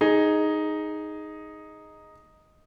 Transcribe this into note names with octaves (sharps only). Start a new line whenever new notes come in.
D#4 G#4